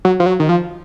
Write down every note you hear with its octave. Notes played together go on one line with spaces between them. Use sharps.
F#3
F3
F#3
D#3
F3